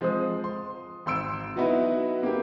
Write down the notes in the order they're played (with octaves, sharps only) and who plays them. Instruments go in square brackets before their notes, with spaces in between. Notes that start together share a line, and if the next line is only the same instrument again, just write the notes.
[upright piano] F3 G#3 C4 C5 D#6
C6
G#1 C6 E6 D7 E7
F#3 B3 D#4 E4 F#4 B4
A#3 G4